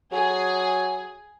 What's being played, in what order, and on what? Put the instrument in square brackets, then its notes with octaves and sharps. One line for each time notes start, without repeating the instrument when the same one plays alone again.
[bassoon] F#3 [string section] G#4